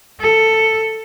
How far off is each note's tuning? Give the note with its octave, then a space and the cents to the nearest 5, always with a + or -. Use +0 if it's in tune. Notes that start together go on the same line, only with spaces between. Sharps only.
A4 +10